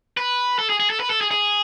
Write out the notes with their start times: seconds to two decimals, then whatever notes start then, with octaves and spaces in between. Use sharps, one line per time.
0.17 B4
0.59 A4
0.70 G#4
0.80 G#4
0.90 A4
1.00 B4
1.10 A4
1.21 G#4
1.31 G#4